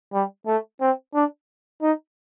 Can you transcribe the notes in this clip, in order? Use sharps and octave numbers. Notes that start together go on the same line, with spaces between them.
G3
A3
C4
D4
D#4